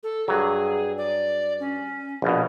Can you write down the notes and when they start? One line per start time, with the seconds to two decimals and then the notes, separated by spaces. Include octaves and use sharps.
0.03 A4
0.28 G2 F#3 G#4
0.97 D5
1.60 C#4
2.22 A#1 B2